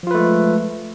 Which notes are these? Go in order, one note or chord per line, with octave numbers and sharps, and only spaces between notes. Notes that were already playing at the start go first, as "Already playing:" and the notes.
F3 G#3 A3 F4 B4